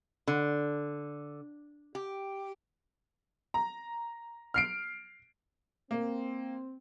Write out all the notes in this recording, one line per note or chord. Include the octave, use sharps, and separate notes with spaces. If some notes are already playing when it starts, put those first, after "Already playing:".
D3
G4
A#5
F6 C7 D7
A#3 C4